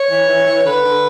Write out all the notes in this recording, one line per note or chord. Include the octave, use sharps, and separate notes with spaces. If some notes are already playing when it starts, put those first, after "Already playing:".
Already playing: C#5
E3
E3
E3
D3 B4
D3